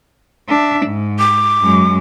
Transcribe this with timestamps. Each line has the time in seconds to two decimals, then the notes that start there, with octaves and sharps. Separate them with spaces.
0.49 D4 E5
0.86 G#2
1.19 D6
1.62 F#2 G#3